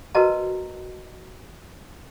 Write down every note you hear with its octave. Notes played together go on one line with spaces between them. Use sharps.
F#4 A#4 B4 D#5 A5 A#5